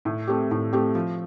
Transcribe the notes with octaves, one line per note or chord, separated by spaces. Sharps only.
A2
A3 C4 G4
A2
A3 C4 G4
F3